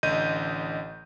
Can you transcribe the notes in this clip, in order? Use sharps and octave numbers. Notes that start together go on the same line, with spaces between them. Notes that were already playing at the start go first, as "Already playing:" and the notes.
A1 D3 D#5 G6 D#7